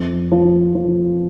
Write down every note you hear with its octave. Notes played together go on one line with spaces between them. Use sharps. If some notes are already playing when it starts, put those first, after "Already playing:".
Already playing: F2
F3
F3